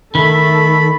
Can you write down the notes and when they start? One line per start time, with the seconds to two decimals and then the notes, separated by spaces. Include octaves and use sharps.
0.15 D#3 A3 A4 B5